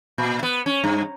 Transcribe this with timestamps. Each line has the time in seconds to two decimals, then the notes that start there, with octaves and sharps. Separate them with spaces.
0.18 A#2
0.43 B3
0.66 C#4
0.84 G2